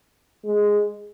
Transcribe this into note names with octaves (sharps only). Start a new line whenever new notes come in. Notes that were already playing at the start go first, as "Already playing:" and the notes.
G#3